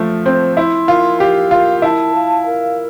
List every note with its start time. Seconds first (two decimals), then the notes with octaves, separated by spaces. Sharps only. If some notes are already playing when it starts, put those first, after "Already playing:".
Already playing: F3 A3
0.26 C4 C5
0.57 E4 C6
0.88 F4 A#4
1.20 G4 F5
1.51 F4 A#4
1.82 E4 A5
2.14 F5
2.45 A#4